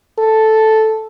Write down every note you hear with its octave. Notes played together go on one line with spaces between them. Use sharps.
A4